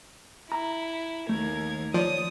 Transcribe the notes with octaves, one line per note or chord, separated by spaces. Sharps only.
E4 A#5
D#2 A3 A#4 G#6
F3 C#5 D5 D#6